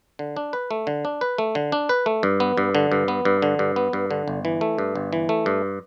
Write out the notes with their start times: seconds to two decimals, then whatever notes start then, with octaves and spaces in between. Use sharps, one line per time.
0.19 D3
0.37 D4
0.53 B4
0.71 A3
0.87 D3
1.05 D4
1.21 B4
1.38 A3
1.55 D3
1.72 D4
1.89 B4
2.06 A3
2.23 G2
2.40 B3
2.58 G2
2.75 D3
2.92 G2
3.08 B3
3.25 G2
3.42 D3
3.59 G2
3.76 B3
3.93 G2
4.11 D3
4.28 G1
4.45 E3
4.61 A3
4.78 G2
4.95 G1
5.13 E3
5.29 A3
5.46 G2